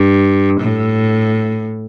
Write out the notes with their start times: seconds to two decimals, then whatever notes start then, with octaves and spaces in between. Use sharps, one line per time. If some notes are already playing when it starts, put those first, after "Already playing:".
Already playing: G2
0.60 A2